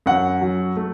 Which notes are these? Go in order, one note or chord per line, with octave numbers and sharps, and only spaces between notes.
F#2 F#5
F#3
A3